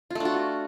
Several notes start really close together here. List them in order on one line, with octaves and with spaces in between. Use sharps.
F4 A3 D4 F#4